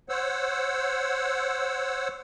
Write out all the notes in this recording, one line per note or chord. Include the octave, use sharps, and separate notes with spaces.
C5 C#5 F#5 E6